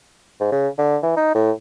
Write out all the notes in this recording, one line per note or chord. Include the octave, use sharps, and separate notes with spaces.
G#2
C#3
D3
E3
D#4
A2